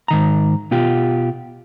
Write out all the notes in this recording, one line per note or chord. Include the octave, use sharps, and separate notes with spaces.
G#2 D#3 A#5
B2 F4 G4